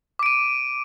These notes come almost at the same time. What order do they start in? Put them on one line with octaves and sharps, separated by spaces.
D6 D7 D#7